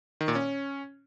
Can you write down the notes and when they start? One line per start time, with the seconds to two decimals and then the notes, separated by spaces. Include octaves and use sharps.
0.21 D#3
0.28 A#2
0.35 C#4